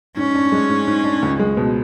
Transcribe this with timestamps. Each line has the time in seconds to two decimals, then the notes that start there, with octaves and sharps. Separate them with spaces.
0.17 G#2 C#4
0.34 D4
0.52 G#3
0.69 G#2
0.87 G#2
1.04 D4
1.22 C#2
1.39 G#3
1.57 B2